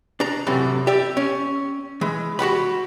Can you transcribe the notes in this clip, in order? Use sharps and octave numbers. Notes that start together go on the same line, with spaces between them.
D4 A#5
F#2 A2 C3 E3
G4 D5 E5
C#4
E3 G#3
F#4 G4 F#5 B5